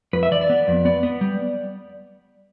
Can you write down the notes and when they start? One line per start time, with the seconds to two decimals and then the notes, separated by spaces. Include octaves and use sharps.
0.13 F2 B4
0.23 E5
0.31 E3 D5
0.41 D5
0.50 B3
0.68 F2
0.85 B3 D5
1.03 B3
1.21 G3